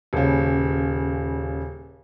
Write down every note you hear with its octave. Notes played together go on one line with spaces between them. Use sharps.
D#1 C#3